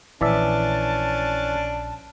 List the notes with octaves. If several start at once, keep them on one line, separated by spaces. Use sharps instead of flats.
A#1 E3 C#4 D4 D5 E5 A5